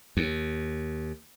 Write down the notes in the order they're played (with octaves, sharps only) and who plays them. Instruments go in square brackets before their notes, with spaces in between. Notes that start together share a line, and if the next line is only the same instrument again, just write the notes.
[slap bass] D#2